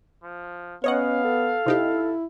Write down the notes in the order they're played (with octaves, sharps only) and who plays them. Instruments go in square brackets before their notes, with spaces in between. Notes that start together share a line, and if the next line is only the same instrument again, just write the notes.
[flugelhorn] F3
[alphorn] B3 [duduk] C#4 [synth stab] C#5 D#5 F#5 [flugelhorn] F5
[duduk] A4
[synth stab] C3 D#4 G4 [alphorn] E4